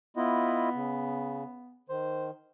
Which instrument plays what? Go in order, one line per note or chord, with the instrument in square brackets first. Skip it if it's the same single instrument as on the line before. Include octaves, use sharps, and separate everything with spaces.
[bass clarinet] B3 [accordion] E4 F4 D#5
[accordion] C#3
[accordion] D#3 [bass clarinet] C5